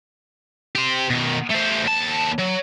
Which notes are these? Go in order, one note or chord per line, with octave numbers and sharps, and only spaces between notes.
G4 C5
B2 D#3
A3 C5
D#2 A5
F#3